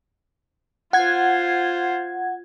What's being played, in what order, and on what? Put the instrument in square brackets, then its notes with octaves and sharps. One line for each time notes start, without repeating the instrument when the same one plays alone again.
[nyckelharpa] F4 C5 [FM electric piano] F#5 G#6